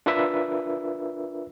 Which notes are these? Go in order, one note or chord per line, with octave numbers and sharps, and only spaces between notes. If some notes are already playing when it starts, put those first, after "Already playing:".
D4 F4 A#4 B4 E5